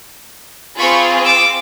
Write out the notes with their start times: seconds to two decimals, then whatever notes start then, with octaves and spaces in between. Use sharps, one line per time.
0.79 C4 F4 G#4 B5 C#6
1.25 D6 E6